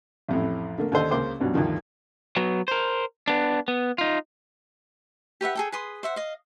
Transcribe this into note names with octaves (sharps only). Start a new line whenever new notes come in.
A1 F2 A2
D3 A3 A#3
D#2 D3 D4 A4 C5 D#5
C#2 C#3 A#3 C5 D6
C2 G2 B2 F#3
D2 G2 D#3 F3
F#3 B3
A#4 C5
B3 D4
B3
D#4 F4
G4 B4 E5 F#5
G#4 A4 G5
G#4 B4 C6 D#6
C5 E5 F#5
D#5 F5